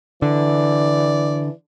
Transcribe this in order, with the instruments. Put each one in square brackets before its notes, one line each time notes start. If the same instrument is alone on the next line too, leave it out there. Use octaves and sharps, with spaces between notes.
[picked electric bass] D3 [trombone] E3 [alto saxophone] D5